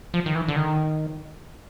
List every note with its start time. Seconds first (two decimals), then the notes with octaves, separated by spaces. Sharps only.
0.14 F3
0.26 D#3
0.35 E3
0.48 D3
0.56 D#3